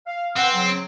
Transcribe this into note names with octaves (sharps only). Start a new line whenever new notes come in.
F5
C4 B4 F#5
C#3 F#3